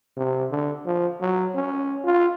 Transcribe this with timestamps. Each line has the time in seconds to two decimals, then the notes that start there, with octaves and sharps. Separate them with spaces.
0.16 C3
0.51 D3
0.86 F3
1.21 F#3
1.55 C#4
2.04 F4